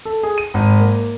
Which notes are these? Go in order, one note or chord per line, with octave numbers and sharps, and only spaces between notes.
A4
G#4
D#7
G#1
A#3